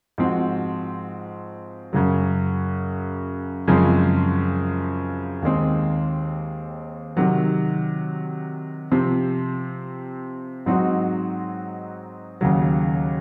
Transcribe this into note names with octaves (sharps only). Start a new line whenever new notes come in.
G#2 F3 C4 F#4
F#2 C#3 F#3
F#2 C#3 F3 G#3 C4
D#2 D#3 G#3 C4
C3 D#3 F#3
C3 F3 C4
G#2 F#3 C4 D#4 F#4
D#2 C#3 F#3